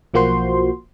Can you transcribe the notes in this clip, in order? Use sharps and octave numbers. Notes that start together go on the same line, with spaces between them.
B1 F3 A#3 F#4 C5 C6